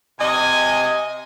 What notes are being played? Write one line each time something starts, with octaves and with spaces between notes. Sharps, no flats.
C3 D#5 G#5